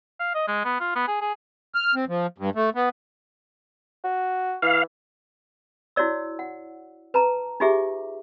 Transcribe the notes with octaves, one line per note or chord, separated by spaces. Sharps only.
F5
D#5
G#3
B3
F4
B3
G#4
G#4
F6
C4
F3
G2
A3
B3
F#4
E3 F5
E4 F#4 C#5 D5 E6
F#5
B4 A5 A#5
D#4 F4 G4 G#4 E5 D6